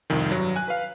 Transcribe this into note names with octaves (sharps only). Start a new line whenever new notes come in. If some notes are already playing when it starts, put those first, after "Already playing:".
C2 F2 D#3
G2 F#3
G#5 F#6
B4 F5